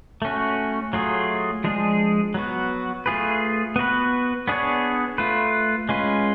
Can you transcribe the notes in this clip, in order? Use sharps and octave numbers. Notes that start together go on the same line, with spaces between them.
A3 C#4 F#4
F#3 A3 F4 G#4
F3 G#3 D4 G#4
F#3 B3 F#4
A3 F4 G#4 B4
B3 F#4 B4
B3 D4 G#4 C#5
A3 F4 B4
G#3 C#4 F4 B4